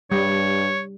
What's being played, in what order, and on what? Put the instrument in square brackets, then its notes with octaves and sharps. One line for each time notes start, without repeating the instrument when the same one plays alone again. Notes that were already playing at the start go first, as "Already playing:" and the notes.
[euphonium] G2 [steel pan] G3 [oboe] C#5